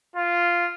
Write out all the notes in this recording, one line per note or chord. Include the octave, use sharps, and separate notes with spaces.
F4